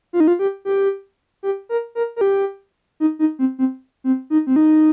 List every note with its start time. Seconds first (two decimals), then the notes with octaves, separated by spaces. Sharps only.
0.13 F4
0.20 D#4
0.28 F4
0.39 G4
0.65 G4
1.43 G4
1.69 A#4
1.95 A#4
2.16 A#4
2.21 G4
3.00 D#4
3.19 D#4
3.39 C4
3.59 C4
4.04 C4
4.30 D#4
4.47 C4
4.56 D#4